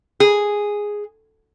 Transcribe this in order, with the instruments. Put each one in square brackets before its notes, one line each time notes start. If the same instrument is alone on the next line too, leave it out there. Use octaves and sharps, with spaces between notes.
[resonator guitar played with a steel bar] G#4